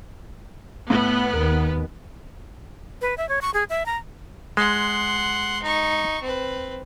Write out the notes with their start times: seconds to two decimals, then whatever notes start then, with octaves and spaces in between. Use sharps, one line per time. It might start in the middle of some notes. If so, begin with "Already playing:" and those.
0.90 A2 B3
1.33 D#2 A#4
3.01 B4
3.18 E5
3.29 C#5
3.42 C#6
3.54 G#4
3.70 E5
3.86 A#5
4.57 G#3 F#5 C6
5.62 D#4 C#6
6.22 C4 B4